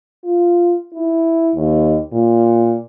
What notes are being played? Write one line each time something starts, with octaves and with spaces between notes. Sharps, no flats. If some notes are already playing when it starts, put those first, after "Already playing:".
F4
E4
D#2
A#2